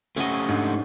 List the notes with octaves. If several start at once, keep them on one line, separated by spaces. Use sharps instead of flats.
A3 C#4 G4 D#5 F#5
G#2 D4